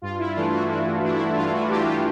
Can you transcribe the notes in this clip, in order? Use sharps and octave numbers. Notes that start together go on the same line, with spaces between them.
G2 F4
E4
E3 A3 D4 F4
F#4
G2 E4
E3 A3 D4
E4
G2 F4
F#4
E3 A3 D4 G4
F#4
F4